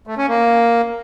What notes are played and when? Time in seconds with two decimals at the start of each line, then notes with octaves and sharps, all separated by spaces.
0.07 A3
0.18 C#4
0.28 A#3